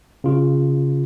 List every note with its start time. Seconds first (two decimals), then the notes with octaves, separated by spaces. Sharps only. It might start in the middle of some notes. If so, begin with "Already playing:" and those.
0.24 C#3 F4